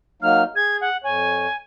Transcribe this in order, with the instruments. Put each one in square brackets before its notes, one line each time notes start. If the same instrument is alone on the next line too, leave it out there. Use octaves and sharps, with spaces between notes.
[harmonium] F#3 A#3 D#4 [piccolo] F6
[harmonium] G#4 [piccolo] G#6
[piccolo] F#5
[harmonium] F2 C#5 [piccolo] G#5